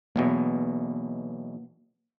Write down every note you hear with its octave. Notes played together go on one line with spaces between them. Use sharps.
B1 E2 B2 A#3